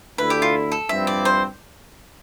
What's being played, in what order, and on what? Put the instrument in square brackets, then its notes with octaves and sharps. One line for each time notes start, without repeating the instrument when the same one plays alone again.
[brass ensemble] D2 D3 A3 E4 [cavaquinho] B4
[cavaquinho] G4
F4
A4
[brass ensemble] G2 F3 C4 E4 [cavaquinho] E5
[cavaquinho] D5
C5